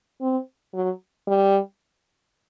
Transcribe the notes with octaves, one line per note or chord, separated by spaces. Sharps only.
C4
F#3
G3